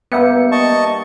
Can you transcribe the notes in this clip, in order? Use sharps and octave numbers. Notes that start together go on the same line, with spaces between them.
G2 A#3 B3 E5 G5 C#7
D#5 A5 C#6